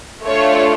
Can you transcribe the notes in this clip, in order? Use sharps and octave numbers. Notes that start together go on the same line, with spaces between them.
A3 D4 F4 C#5